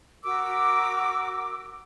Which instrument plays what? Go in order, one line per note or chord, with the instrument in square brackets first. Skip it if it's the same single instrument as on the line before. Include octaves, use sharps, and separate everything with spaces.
[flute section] F#4 A#4 D6 E6